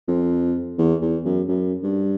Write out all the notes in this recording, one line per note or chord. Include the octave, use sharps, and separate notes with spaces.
F2
E2
E2
F#2
F#2
G2